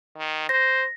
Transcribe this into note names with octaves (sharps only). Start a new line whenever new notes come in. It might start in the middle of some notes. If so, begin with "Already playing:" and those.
D#3
C5 A#6